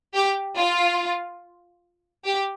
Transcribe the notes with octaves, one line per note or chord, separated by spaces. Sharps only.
G4
F4
G4